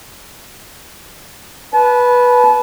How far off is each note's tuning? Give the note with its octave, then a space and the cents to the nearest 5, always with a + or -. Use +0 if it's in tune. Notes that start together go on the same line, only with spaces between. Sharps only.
B4 -10 A5 -35